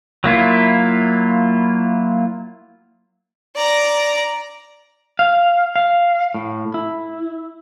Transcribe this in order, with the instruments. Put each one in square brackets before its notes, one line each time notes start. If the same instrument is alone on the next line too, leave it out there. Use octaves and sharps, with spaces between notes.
[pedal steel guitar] F#3 A#3 E4 F4
[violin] D5 A#5
[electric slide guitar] F5
F5
A2
E4